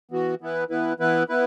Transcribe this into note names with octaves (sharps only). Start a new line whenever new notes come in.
E3 B3 F#4
E3 B3 E4 B4
E3 B3 E4 B4
E3 B3 E4 B4
B3 E4 B4